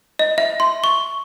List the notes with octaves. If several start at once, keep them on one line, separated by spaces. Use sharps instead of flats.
D#5
E5
C6
C#6